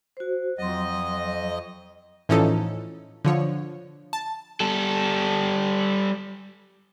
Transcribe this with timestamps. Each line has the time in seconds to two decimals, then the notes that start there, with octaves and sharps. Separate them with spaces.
0.17 F#4 C5
0.58 F2 F#3 D#5 C6
2.29 A2 E3 F3 C#4 D#4 A4
3.25 D3 F3 C#5
4.13 A5
4.60 G3 A4